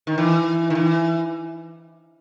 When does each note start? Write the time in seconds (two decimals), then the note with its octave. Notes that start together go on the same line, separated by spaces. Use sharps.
0.07 D#3
0.18 E3
0.70 D#3
0.75 E3